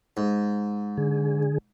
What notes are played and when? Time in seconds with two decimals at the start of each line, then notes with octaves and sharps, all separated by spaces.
0.17 G#2
0.97 D3 G#4